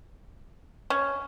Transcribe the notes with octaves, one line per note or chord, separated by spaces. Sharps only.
C#4